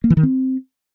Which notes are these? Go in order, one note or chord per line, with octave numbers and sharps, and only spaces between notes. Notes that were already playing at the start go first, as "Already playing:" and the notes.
A#3
E3
D#3
C4